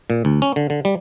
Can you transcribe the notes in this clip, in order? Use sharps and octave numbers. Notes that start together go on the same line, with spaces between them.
A#2
D2
C#4
D3
D3
G3